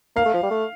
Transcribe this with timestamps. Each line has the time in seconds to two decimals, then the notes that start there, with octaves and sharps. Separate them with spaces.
0.16 A#3 F5
0.26 A3
0.34 F3
0.43 G3
0.51 A3